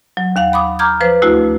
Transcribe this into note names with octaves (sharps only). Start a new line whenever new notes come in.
F#3
D#2 F5 F#5
B5 D6 D#6
A#5 D6 F6 G6 G#6
F3 B4 C5
D2 A3 E4 F#4